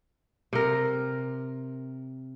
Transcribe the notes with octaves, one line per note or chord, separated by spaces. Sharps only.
C3 A#4